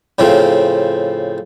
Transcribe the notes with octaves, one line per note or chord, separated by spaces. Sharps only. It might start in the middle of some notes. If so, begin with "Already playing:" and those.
A2 C#3 F3 C4